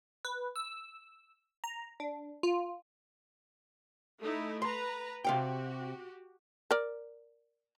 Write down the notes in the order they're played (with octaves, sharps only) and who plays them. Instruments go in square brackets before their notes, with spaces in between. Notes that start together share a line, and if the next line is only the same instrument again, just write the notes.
[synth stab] B4
E6
A#5
D4
F4
[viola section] A3 D#4 E4
[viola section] B4 A#5 [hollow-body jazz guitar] C6
[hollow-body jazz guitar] C3 F5 G5 [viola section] F#4 G4
[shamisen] A#4 D5